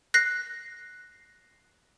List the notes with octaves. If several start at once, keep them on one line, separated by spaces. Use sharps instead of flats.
F#6 A#6 C7